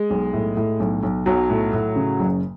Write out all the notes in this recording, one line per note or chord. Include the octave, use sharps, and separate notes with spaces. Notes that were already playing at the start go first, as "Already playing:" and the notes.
Already playing: G#3
B1
A2
A2
B1
B1
B1 F#3
A2
A2
C#3
F#1